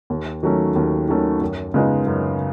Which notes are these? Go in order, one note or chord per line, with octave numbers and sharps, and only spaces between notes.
D#2
D#3 F#3 A3 C#4
D#2
D#3 F#3 A3 C#4
F#2
C#3 G#3 B3 D#4
F#2